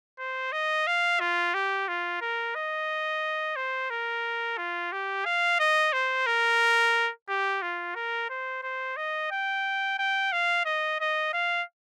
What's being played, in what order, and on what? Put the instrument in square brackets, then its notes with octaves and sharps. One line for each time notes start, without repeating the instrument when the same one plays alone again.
[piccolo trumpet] C5
D#5
F5
F4
G4
F4
A#4
D#5
C5
A#4
F4
G4
F5
D#5
C5
A#4
G4
F4
A#4
C5
C5
D#5
G5
G5
F5
D#5
D#5
F5